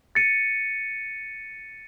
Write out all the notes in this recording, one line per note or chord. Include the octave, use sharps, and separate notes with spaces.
A6 C#7 D#7